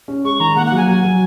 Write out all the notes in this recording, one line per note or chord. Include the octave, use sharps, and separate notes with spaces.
C#4
G#3 C#6
D#3 A#5
A#3 F#5
F#5
F#3
G#5
F#4
F#3